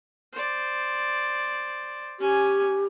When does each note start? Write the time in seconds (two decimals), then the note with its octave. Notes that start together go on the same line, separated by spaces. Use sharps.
0.33 C5 D5
2.20 C#4 G4 G#5